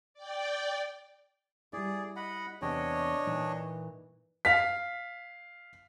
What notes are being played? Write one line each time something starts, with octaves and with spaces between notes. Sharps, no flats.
D5 G5
G3 E4 G#4 D5
D#5 F#5 B5
E2 C3 D4 C#5 D#5 G5
A#2 E3 D#4
F5 B6